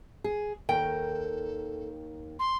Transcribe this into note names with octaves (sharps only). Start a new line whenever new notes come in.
G#4
D#2 D#3 A4 A#4 G5
C6